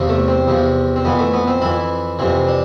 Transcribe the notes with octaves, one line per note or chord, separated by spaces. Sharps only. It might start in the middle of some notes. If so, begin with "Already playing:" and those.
Already playing: E2 C3 F3
A3
C4
E2 C3 F3
C4
F2 E3 B3
A3
B3
C4
F2 E3 E4
F2 C3 E3 C4
D4